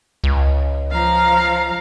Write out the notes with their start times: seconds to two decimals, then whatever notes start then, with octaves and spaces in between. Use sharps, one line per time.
0.24 C#2
0.91 F3 F5 A#5